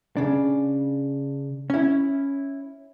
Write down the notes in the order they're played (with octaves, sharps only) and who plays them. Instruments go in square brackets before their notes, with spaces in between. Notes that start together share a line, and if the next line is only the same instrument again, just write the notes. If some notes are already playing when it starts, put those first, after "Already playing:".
[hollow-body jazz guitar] C#3 D4
C#4 E4